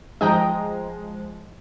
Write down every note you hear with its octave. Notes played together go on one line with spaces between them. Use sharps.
F3 G#3 D#5 G5 A#5